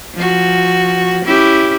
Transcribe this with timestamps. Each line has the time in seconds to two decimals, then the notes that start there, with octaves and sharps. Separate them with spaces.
0.15 F3 F#4
1.25 C#4 E4 G4